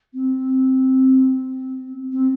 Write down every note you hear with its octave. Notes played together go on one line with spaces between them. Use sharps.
C4
C4